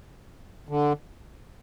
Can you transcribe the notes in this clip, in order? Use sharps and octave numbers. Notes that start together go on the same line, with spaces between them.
D3